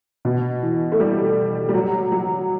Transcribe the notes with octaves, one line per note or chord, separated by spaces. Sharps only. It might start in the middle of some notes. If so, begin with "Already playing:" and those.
B2
E3
A3
G3
G3
F#3
F#3